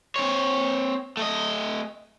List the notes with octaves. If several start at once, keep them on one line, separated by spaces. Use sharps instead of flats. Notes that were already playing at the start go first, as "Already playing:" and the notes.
C4 C#5
A3 D#5